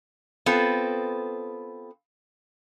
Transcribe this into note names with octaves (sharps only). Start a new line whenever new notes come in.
B3 C4 F4 A4